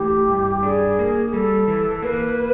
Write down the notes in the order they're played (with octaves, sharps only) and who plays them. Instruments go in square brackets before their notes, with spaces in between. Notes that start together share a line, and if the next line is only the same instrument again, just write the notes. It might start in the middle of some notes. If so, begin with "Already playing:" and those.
Already playing: [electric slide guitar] E3 A3 [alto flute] G4
[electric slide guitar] G2
[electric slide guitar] D4 [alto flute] G#4
[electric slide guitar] A#3
[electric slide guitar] G3 [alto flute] A4
[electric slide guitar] E3
[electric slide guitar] A#3 [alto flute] B4